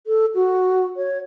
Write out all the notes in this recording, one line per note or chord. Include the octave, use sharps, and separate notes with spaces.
A4
F#4
C#5